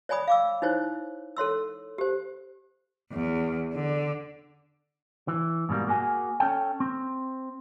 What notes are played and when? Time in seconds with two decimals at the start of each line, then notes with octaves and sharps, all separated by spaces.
0.09 C#5 D5 G#5 B5 D#6
0.28 F5 D6 E6
0.62 D#4 E4 C5 C#5
1.37 A4 C#5 C6 E6
1.98 G4 C5
3.12 E2
3.74 D3
5.28 E3
5.69 G#2 B2 G3 A#3
5.87 A#3 F#4 G#4 G#5
6.40 C#4 A4 G5
6.80 C4